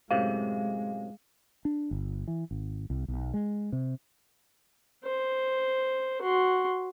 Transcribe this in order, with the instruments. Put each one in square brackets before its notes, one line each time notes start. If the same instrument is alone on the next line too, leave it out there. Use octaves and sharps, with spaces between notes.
[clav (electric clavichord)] F#2 A2 C3 [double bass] G#3 [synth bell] F5
[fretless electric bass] D4
G1
E3
G#1
C2
B1
G#3
C3
[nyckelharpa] C5
F#4 C6